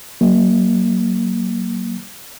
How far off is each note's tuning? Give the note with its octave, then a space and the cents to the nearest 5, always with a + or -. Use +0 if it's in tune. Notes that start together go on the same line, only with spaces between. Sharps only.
F#3 +20 A#3 +0